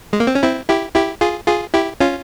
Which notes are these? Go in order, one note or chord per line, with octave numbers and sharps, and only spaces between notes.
G#3
A#3
C4
C#4
C4 E4
E4 G4
E4 G4
F4 G#4
F4 G#4
E4 G4
C#4 F4